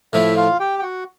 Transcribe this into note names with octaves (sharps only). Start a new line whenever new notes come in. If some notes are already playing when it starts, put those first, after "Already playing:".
A2 F3 A3 E4 E5
F4 F5
G4 G5
G5
F#4 F#5